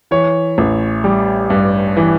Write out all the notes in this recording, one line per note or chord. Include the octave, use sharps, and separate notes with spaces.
E3 C#5
A1
G3
G2
E3